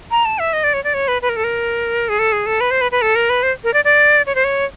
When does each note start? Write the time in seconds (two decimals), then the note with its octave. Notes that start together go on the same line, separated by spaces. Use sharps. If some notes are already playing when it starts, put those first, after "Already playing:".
0.11 A#5
0.25 A5
0.39 E5
0.53 D#5
0.64 D5
0.74 C#5
0.84 D5
0.94 C#5
1.08 B4
1.22 B4
1.29 A#4
1.36 A4
1.44 A#4
2.09 G#4
2.19 A4
2.32 G#4
2.46 A4
2.61 B4
2.71 C5
2.81 B4
2.92 B4
3.02 A4
3.16 A#4
3.30 B4
3.43 C5
3.64 A#4
3.74 D5
3.85 D5
4.26 C#5
4.35 C5
4.44 C#5